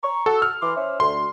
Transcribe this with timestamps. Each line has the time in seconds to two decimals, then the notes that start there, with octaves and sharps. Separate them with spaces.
0.03 A#5 C#6
0.26 F#4 A4 F#5 E6
0.42 F6
0.61 E3 C6 D6
0.75 C#4 C5 E5
1.00 D2 C6